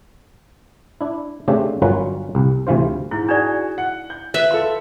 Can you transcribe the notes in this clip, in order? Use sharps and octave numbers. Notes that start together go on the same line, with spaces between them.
D4 E4
C#3 A3 C4 D4 G4 A4
G1 F#3 C#4 F4 A#4 B4
C2
D2 C3 E3 F4 C5
G#2 E4
D4 D#4 F#4 G#4 D5
F#5
G6
B4 E5
F4 A4 C6